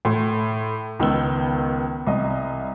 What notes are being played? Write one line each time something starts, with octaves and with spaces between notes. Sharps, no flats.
A2 C6
C#2 D#3 B3 E6 G7
C2 D#5